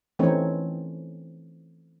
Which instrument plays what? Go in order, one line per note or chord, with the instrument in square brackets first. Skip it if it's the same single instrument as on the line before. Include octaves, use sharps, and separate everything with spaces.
[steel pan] E3 A3 C4 C#4 D#4 C#5